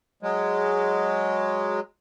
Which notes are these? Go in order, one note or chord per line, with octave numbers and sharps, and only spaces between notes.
F#3 G#3